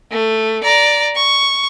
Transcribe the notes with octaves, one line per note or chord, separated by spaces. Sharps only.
A3
D5 A#5
C#6